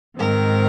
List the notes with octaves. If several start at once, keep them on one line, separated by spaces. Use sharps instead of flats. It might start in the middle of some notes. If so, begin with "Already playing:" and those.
G#2 D#3 C4 A#4